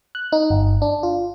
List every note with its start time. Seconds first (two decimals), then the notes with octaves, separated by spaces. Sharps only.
0.15 F#6
0.32 D#4
0.50 G1
0.82 D4
1.03 F4